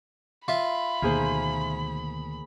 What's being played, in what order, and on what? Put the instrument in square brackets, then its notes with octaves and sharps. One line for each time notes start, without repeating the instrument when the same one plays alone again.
[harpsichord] F4 E5 [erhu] B5
[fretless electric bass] D2 B2 D#3 [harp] A#3 G#4 C5